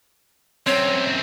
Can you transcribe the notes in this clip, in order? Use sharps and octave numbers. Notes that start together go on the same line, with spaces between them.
F#2 C4 C#5